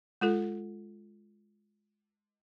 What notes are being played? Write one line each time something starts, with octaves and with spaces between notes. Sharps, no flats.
G#3 F4 A4